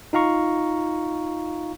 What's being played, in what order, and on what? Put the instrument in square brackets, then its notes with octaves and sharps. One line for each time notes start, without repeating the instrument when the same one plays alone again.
[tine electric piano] D#4 F4 F5 A#5 C#6